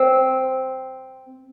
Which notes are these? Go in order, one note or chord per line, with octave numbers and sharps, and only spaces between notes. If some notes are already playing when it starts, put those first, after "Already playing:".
Already playing: C4